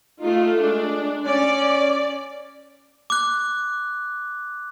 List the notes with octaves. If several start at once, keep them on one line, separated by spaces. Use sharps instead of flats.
A3 D#4 F4
G#3 D4
C#4 D5
D6 F#6